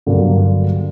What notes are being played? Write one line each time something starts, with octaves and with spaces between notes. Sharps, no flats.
G2 D3 F#3 A#3 F#4